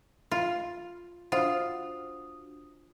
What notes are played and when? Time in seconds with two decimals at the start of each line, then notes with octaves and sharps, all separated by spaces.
0.31 F4
1.32 D4 F4 F#4 C5 F#5 D#6